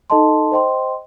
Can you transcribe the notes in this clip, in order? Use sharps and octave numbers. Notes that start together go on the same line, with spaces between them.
D#4 A4 D#5 A5 C6
C5 D#5 G5 C6